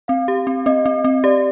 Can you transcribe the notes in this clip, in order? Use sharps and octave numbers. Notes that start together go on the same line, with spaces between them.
C4 F5
G4
C4
C4 D#5
C4
C4
G4 D5